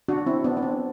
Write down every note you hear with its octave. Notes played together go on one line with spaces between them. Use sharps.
D4 F#4
C4 E4
B3 D4
D4
C4